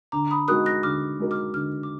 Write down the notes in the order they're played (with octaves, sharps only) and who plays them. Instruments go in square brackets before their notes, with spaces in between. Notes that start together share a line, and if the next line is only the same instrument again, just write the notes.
[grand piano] D3 [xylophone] A#5 D6
[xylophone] B5 D#6
[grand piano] G#3 D#4 F#4 A#4 [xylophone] D#6 F#6
[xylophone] F#6 A#6
[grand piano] D3 [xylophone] D6 F6
[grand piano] G#3 D#4 F#4 A#4
[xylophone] D6 F6
[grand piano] D3 [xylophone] D6 F6
[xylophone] D6